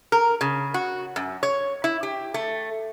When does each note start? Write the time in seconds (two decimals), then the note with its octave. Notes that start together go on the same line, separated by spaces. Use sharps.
0.12 A#4
0.41 C#3
0.74 F#4
1.16 F#2
1.43 C#5
1.84 E4
2.03 G4
2.34 A3